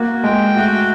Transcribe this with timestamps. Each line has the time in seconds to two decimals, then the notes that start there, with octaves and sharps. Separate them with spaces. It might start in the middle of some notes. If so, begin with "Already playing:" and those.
Already playing: A#3 F#4
0.24 G#3 G5
0.56 A3 F#4